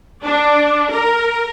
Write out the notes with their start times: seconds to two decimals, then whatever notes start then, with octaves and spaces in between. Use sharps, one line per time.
0.23 D4
0.89 A#4